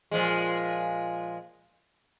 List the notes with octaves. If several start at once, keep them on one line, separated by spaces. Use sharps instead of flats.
A#2 F3 G#3